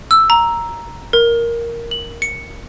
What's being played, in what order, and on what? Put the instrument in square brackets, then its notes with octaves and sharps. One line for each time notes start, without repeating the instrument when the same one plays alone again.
[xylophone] E6
A#5
A#4
F#7
C#7